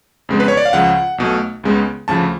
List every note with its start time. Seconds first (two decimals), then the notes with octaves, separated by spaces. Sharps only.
0.29 F2 C#3 G#3 B3
0.40 B4
0.48 C#5
0.57 D5
0.65 F5
0.73 C#2 C#3 F3 F#5
1.18 B1 B2 A3
1.64 C#2 C#3 G#3 B3
2.08 D2 C#3 F3 A5